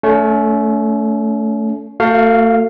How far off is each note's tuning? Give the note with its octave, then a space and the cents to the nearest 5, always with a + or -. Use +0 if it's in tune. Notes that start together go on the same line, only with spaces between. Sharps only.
A3 +0 C#4 +35
A3 +35 F#4 +0 F5 +0